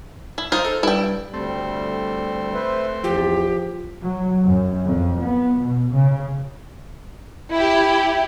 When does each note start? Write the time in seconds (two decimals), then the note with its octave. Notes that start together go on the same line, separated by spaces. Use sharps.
0.38 E4
0.52 D#4 F4 A#4 C5
0.65 A4
0.83 G2 E4 G5
1.34 D2 G3 A3 C4
2.54 B4 C5 E5
3.04 E2 F3 G4
4.03 F#3
4.44 F#2
4.85 F2
5.22 B3
5.61 B2
5.94 C#3
7.53 E4 G4